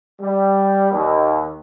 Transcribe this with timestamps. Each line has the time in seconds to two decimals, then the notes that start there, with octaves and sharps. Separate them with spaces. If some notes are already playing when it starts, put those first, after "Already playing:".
0.20 G3
0.91 D#2